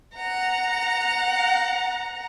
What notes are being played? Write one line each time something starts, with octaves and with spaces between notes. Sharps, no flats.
F#5 A#5